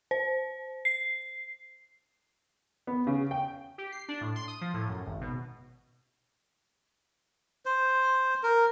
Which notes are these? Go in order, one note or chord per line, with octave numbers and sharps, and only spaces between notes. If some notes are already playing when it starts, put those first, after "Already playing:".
C5
C7
B3
C#3
G5
G4
C7
D4
A2
C6
D#6
F3
A2
F#2
G#1
B2
C5
A#4